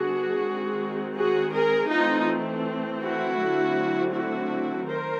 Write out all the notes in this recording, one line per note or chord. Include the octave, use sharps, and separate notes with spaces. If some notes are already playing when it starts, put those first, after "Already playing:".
Already playing: D3 G3 B3 D4 F#4 G#4
D#3 G#3 C4
F#4 G#4
G#4 A#4
E3 A3 C4 D#4 F4
E4 F#4
D3 F#3 A3 C4
E4 F#4
D#3 A#4 C5